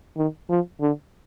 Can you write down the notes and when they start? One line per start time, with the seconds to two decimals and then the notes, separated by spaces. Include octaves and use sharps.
0.17 D#3
0.50 F3
0.81 D3